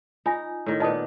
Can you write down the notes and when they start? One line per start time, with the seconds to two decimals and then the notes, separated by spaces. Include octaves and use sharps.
0.26 D#4 F4 G#5
0.66 A2 D#3
0.80 A#2 B3 D#5 A5 D#6